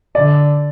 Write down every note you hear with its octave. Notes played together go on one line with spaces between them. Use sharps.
D3 D5